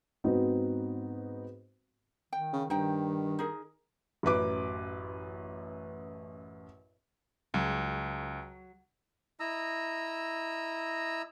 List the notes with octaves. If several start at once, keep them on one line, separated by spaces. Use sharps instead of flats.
G#2 B3 C4 D#4 F#4
D#3 G5
C#3
G2 D#3 D#4 C5 G5
D#4 G#4 A#4
A1 F#2 B4 D6
C#2 F#3
E4 D#5 A#5 E6